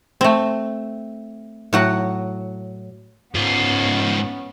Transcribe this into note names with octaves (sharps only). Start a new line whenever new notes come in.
A3 C4
A2 F#3 F#5
G#2 B3 C#4 F4